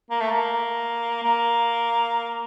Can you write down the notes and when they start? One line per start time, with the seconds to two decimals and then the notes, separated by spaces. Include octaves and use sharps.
0.11 A#3
0.21 A3
0.31 A#3
1.23 A#3